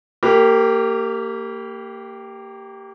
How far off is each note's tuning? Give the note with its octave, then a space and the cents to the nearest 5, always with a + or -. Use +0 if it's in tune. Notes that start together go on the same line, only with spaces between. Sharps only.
A#3 -25 G4 +0 B4 +0